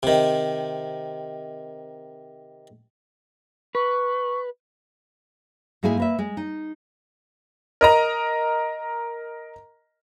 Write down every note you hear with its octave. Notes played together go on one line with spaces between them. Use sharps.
C3 D#3
B4 C#6
G#2 G#3 A#3 E4 G#4 G#5
A#3 B4 E5
G#3
D#4
A#4 D#5 A#5